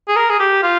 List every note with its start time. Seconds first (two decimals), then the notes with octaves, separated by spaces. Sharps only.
0.08 G#4
0.16 A#4
0.30 G#4
0.40 G4
0.63 F4